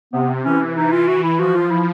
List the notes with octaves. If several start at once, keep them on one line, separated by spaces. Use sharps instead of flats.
C3 B3
E3 C#4
E3 D#4
F4
F#4
E4
F3 F#4
F4
E4